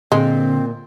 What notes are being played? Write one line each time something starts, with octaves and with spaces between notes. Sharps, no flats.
A#2 D3 G#3 C4